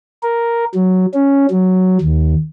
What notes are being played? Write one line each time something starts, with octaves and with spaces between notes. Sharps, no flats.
A#4
F#3
C#4
F#3
D#2